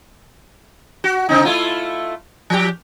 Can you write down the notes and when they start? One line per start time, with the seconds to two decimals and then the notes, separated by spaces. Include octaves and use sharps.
1.04 F#4
1.29 C#3 C4 D#4
1.45 A3 E4 F4
2.50 F3 G4